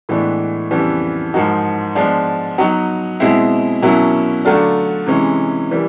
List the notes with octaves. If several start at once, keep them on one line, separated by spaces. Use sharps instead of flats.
A2 E3 G#3 B3 D4
F2 C#3 E3 G3 B3
G#2 F3 A#3 D#4 F#4
F3 G#3 B3 D4
F#3 B3 D#4 F#4
B2 G#3 C4 E4
B2 F#3 A#3 C#4 E4
D3 F#3 A3 D4 F4
C3 E3 G#3 C#4
E3 G3 A#3